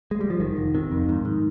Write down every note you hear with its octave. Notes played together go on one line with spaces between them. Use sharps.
G#3
G3
F3
F1 D#3
F1
C3 D#3
F2
G#2
G#2